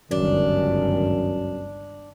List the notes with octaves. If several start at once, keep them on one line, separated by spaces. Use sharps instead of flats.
G1 C#2 F#2 D#3 D4